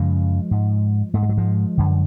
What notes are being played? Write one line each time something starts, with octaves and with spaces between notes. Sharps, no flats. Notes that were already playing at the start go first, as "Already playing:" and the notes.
Already playing: F#2 C#3 F3 G#3
G#2
G#2 A3
G#3
F#3
F3 G#3
F#2 D3